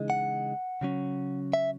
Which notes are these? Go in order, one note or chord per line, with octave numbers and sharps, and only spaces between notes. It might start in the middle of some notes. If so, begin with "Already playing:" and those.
Already playing: C#3 E3 G#3 D#4
F#5
C#3 F#3 C#4
E5